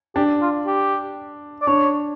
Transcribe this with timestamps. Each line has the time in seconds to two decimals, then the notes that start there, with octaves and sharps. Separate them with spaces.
0.16 D4 G4
0.42 F4
0.66 G4
1.62 D5
1.67 D4 C#5